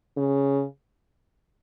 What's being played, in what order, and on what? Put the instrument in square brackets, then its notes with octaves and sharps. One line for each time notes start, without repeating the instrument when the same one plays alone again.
[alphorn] C#3